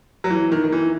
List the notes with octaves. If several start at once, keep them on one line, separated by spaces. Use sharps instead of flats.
F#3
E3
D#3
D#3
E3